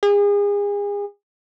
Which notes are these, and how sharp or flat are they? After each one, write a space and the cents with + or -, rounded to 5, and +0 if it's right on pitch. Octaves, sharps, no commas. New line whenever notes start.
G#4 -35